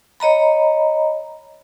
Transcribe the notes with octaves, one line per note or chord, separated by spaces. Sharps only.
C#5 D#5 A#5 B5